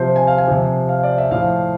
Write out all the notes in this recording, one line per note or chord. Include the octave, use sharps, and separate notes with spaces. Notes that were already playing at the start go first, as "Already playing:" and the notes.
Already playing: C3 F3 C5
G#5
F5
G#5
C3 F3
F5
D5
E5
A2 F3 F5